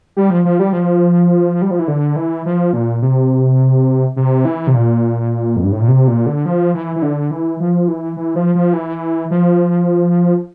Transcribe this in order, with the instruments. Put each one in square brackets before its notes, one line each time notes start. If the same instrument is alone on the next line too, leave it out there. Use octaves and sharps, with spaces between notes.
[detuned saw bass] G3
F3
F3
G3
F3
G3
F3
E3
D3
E3
F3
A#2
C3
C3
E3
C3
A#2
F2
G2
A2
A#2
C3
A#2
D3
F3
E3
E3
D3
E3
F3
E3
E3
F3
F3
E3
F3